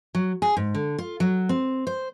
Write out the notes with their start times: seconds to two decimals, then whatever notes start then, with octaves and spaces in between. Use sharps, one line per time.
0.15 F#3
0.42 G#4
0.57 G#2
0.75 D3
0.98 F4
1.20 F#3
1.49 C4
1.87 C5